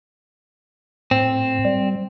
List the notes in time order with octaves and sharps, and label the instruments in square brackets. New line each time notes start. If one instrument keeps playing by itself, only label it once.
[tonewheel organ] A2 [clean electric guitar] C4
[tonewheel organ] G3